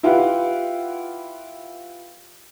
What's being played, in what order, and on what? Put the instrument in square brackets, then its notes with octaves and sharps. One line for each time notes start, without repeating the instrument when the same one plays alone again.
[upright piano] E4 F4 G4 B4 F#5 G5